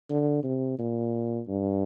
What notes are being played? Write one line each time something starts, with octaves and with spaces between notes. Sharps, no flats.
D3
C3
A#2
G2